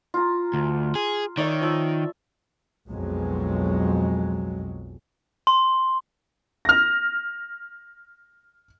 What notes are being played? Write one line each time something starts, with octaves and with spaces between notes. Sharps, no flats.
F4 A#5
D2
G#4
D#3 C#5 D5 E5
F3 E5
B1 F2 F#3 G#3
C6
F6 A#6